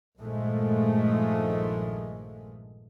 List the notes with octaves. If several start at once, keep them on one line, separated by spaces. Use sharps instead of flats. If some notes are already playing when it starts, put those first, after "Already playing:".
A#1 G2 D#3 F3 G#3 A3